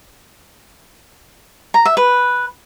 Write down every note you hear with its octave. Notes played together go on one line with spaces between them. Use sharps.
A#5
E5
B4